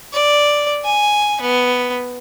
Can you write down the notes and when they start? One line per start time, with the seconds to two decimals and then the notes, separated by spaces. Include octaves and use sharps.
0.13 D5
0.85 G#5
1.41 B3